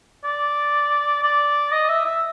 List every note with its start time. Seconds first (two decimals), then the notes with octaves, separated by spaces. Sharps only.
0.24 D5
1.23 D5
1.72 D#5
1.89 E5
2.05 E5